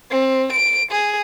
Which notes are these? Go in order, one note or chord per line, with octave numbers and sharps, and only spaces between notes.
C4
D7
G#4